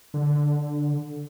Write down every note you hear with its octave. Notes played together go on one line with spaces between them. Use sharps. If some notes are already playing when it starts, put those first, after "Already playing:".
D3